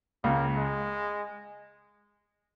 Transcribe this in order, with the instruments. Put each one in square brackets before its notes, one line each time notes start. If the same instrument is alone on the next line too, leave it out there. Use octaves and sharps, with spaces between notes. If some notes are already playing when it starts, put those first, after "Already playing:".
[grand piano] C#2 C#3 [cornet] A#3
[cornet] G#3